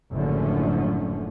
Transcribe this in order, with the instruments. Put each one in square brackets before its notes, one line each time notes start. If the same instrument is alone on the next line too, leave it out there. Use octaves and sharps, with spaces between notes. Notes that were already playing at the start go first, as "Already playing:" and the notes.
[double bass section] F#1 F#2 A2 D3 F3 C#4